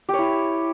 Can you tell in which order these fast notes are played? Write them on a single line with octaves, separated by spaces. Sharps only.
G4 C#5 E4